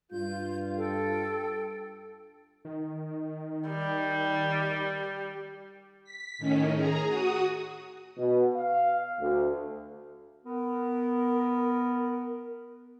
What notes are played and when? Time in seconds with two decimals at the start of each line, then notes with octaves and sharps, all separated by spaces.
0.11 G2 F4 G6
0.77 A4 G5
2.65 D#3
3.69 G3
6.04 B6
6.38 A2 D#3 C#4
6.74 G#4 A#5
7.05 F#4 D#6
8.17 B2
8.56 F5
9.19 D2
10.46 B3 A#4